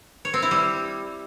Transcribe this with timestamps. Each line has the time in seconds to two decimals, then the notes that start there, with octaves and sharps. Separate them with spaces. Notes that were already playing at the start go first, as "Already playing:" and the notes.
0.25 C#5
0.34 C4
0.42 E4
0.51 G3